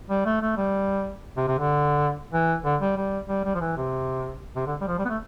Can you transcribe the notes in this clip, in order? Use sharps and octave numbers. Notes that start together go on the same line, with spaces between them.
G3
A3
A3
G3
C3
C3
D3
E3
D3
G3
G3
G3
G3
F3
E3
C3
C3
D3
G3
F3
G3
B3
A3